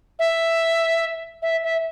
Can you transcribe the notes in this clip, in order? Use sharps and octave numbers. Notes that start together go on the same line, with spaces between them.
E5
E5
E5